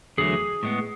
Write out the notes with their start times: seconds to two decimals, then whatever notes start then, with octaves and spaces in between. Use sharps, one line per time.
0.18 E2 D3 F#3 A3 G#4
0.63 A2 G#3 B3